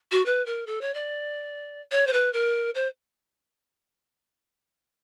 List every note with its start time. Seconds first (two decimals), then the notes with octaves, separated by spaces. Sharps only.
0.12 F#4
0.26 B4
0.46 A#4
0.67 A4
0.81 C#5
0.94 D5
1.92 C#5
2.07 C5
2.13 B4
2.33 A#4
2.75 C5